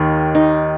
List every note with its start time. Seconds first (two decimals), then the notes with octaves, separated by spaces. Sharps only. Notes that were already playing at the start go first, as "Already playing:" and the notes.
Already playing: D#2 D#3 D#4
0.35 D#4